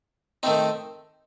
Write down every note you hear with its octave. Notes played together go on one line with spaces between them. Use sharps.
D#3 A3 C4 D#4